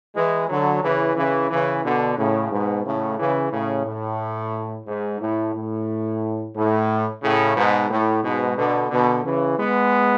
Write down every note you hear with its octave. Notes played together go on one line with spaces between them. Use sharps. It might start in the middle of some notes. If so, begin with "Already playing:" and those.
E3 G#3
D3 F#3
C#3 E3
C#3 E3
C#3 E3
B2 D3
A2 C#3
G#2 B2
A2 C#3
C#3 E3
A2 C#3
A2
G#2
A2
A2
A2
A2 C#3
G#2 B2
A2
G#2 B2
B2 D3
B2 D3
C#3 E3
G#3 B3